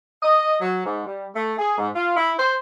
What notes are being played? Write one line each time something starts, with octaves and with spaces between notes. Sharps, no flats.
D#5
F#3
G#2
G3
A3
G#4
G#2
F4
E4
C5